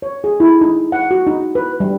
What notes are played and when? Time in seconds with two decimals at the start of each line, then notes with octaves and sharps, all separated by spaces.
0.02 C#5
0.24 G#4
0.40 E4
0.61 D#4
0.92 F#5
1.11 F#4
1.27 D#4
1.55 B4
1.80 G3